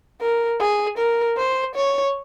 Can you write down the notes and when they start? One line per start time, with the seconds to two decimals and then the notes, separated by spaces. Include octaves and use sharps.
0.21 A#4
0.60 G#4
0.98 A#4
1.37 C5
1.75 C#5